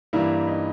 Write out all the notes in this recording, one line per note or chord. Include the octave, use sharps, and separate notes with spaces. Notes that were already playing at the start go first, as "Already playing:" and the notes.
G2 E3 G3 A#3 E4
D#4